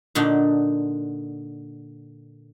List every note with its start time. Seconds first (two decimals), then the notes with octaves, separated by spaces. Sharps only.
0.15 A#2 D3 D4 D#4 F#4